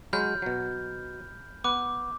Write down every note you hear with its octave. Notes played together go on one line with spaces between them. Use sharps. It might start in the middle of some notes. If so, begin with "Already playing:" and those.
F#3 G#3 B5 F6 G6
B2 F#3
B3 D6 F#6